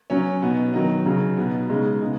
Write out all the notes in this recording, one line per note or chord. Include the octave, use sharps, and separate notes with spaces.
F#3 C#4
B2 B3 D#4
D#3 F#3 D#4
C#3 F#3 D#4
B2 B3 D#4
C#3 G#3 D#4
C#3 B3 D#4